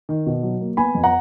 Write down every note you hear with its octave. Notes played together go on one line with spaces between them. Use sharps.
D#3
B2
F#3
A#3
B3 G#5 B5
F2
F#5 A#5